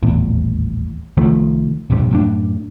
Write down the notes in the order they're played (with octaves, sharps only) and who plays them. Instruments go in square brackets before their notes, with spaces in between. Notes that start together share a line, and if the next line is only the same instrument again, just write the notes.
[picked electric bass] D#1 A1 E2
C2 D#3 F3 A3
E1 A#1 G2 C3
F#2 A2 D4